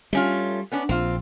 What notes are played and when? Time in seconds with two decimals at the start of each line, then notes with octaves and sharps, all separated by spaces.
0.13 G3 A3 C#4 F4
0.72 B3 C#4 D4
0.89 A#1 C4 F4